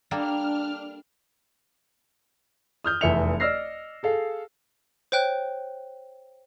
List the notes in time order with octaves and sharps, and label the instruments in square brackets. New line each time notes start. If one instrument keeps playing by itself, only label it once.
[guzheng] G3 A#3 A4 [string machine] D4 F6
[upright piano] D#6 F6 G6
F1 E2 E5 C#7 F7
D5 D#5 E6 F6 A#6 C7
G#4 A4 F5
[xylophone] C5 C#5 G5 F#6